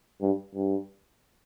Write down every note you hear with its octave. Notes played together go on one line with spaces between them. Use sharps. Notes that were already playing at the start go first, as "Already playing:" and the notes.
G2
G2